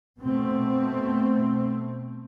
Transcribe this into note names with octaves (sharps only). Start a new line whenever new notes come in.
B2 A3 C4